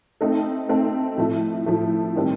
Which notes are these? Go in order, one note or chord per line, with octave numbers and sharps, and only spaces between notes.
A3 C4 D#4 A4
A3 C4 D#4 A4
A2 F3 A3
A2 F3 A3
D#3 G3 C4